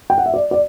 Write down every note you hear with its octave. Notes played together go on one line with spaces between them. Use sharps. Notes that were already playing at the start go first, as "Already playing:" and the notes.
G5
F#5
E5
D5
D5